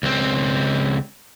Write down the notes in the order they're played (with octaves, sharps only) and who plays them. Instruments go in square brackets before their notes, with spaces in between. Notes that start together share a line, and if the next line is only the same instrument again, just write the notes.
[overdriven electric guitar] C#2 C4